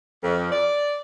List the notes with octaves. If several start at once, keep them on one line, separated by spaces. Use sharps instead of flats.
F2
D5